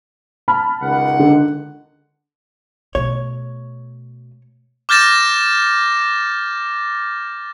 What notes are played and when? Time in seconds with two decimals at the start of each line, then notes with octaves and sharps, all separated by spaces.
0.48 A5 B5 F6
0.82 C#2 D#3 F#5
1.19 D3
2.95 B2 A3 C#5
4.89 D6 F6 G6 A6 A#6 E7